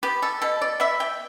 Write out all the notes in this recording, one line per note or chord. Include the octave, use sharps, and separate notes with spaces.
B3 G4
A4
B2 A4
D5
B3 E5
G5